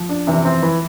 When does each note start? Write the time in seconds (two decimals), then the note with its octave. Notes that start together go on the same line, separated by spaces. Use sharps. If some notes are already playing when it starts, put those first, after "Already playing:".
Already playing: F3
0.09 D4
0.27 C3 E3
0.45 C4
0.62 E3